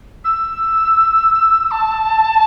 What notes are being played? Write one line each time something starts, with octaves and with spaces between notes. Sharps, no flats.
E6
A5